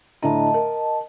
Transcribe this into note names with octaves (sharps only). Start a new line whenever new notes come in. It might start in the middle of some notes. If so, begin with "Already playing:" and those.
A2 D3 D#5 A5 A#5
A#4